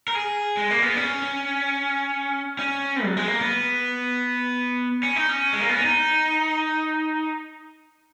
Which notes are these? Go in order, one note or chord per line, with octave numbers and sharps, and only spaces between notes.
A#4
G#4
G#3
A#3
B3
C#4
C#4
F#3
G#3
A#3
B3
C#4
D#4
C#4
G#3
A#3
B3
C#4
D#4